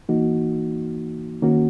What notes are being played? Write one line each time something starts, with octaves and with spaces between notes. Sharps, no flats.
E3 A#3 D#4 F#4
D#3 A#3 C#4 F#4